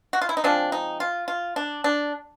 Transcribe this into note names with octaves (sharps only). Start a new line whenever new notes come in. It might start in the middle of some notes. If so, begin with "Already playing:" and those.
F#4
F4
E4
D#4
F3 G#3 C4 D4
D#4
F4
F4
D4
D4